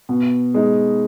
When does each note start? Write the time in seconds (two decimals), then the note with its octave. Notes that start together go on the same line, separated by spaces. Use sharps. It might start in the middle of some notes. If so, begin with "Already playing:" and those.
0.09 B2
0.54 G#3 D#4